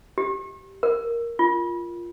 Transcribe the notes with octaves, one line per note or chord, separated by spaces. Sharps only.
G4
A#4
F4